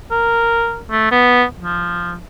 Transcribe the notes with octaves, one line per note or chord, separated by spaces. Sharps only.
A#4
A3
B3
F3